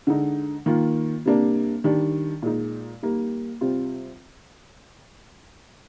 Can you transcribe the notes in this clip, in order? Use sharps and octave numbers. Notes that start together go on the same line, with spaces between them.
D3 G#3 D#4
D#3 A#3 F4
C3 G3 A#3 D4
D#3 G3 D4
A#2 G#3 D#4
G3 A#3 D#4
C3 G3 C4 F4